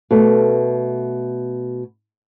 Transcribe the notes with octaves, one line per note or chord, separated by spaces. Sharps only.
B2 A3